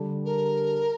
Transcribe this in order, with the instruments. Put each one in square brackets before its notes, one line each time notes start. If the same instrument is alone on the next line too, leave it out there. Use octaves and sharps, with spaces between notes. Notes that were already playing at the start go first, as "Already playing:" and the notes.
Already playing: [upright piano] D3 G3 D4
[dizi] A#4